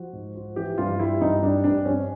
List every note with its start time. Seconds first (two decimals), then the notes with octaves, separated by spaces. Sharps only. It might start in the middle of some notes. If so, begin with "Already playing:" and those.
Already playing: F3 F#4
0.13 G#2
0.36 F3
0.56 E3 G4
0.78 G2 F4
0.99 G3 E4
1.21 G2 D#4
1.42 G3 D4
1.64 G2 D4
1.85 F2 C#4